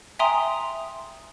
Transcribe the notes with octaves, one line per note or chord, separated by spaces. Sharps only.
E5 G5 G#5 A#5 C6 D#6